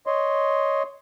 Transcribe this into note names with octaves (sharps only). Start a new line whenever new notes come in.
C#5 D#5 C6